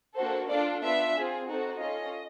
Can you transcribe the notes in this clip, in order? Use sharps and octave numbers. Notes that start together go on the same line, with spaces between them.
A#3 D4 F#4 A4 C5
D4 F4 A4 D5
B3 D4 F4 E5
C4 F4 G#4
C4 D#4 F#4 A4
C#4 F4 A4 D#5